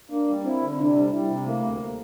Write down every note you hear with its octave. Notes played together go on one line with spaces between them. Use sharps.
A#3 D4
G3
C4 E4
D3
C3 D4
G3
G3 E4
C3
A3 A#3
D2